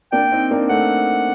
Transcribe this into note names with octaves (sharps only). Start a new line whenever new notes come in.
A#3 D4 G5
C4 D#4
A#3 D4
A3 C4 F#5